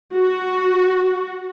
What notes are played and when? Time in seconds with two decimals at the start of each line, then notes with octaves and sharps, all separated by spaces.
0.15 F#4